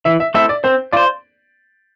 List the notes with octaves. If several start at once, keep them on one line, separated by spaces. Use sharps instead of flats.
E3 E5
E5
A3 C4 E4 A4 E5
D5
C4 C5
F4 C5 D5